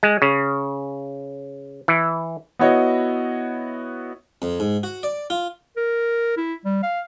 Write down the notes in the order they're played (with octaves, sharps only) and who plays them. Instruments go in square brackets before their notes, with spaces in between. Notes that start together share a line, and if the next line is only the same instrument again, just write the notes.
[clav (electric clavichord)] G#3
C#3
E3
[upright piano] B3 E4 F#4 C#5 D#5
[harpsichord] F2
G#2
F#4
D5
F4
[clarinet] A#4
E4
G3
F5